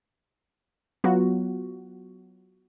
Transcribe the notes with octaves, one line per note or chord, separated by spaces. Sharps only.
F#3 B3 F4 F#4